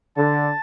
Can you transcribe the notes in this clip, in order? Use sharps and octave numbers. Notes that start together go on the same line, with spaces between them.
D3 A5